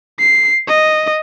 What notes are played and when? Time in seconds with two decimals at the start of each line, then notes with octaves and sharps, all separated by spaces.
0.19 C7
0.68 D#5